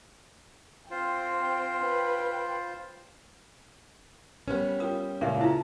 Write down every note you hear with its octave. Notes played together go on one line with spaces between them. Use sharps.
C4 F4 C5 G5
B4 G5
G3 B3 C#4 A#4 C5
F4 A#4 G5 D#6 E6
C#2 A#2 A#4 E5
E4 F4 A5 A#5